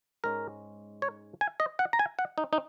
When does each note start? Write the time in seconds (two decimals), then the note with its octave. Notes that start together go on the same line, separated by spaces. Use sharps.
0.24 G#2 G#3 C#4 A#4
1.02 C#5
1.41 G#5
1.60 D#5
1.79 F#5
1.93 A#5
1.99 G#5
2.19 F#5
2.38 D#4
2.53 D#4